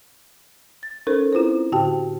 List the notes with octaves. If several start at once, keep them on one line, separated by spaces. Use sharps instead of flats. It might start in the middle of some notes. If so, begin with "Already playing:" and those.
A6
C#4 D#4 A4 A#4 C5
C4 E4 F4 B4 C5
A2 D3 F#4 G4 G5 A5